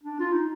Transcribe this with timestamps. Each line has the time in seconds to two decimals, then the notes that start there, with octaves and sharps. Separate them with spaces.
0.03 D4
0.20 F4
0.32 D#4